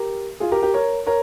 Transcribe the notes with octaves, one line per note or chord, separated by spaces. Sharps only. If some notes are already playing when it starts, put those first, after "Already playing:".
Already playing: G4 A#4
F4 G#4
G4 A#4
G4 A#4
A#4 C#5
A#4 C#5